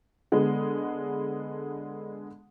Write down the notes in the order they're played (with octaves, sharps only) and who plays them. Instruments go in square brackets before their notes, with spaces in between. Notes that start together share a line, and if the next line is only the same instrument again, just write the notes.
[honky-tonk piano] D3 G#3 B3